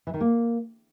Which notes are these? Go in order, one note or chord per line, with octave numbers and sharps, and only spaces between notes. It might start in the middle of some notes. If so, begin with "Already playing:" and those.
E3
D#3
A#3